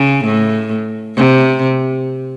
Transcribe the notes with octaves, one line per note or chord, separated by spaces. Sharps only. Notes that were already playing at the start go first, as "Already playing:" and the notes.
Already playing: C#3
A2
C3